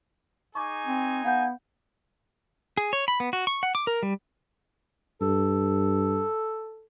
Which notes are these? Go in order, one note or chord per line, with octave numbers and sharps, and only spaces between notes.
D#4 G#4 G#5 C#6 D6
C4
B3 F5 F#5 G6
G#4
C#5
B5
B3
F#4
C#6
F#5
D6
A#4
G3
G2 A4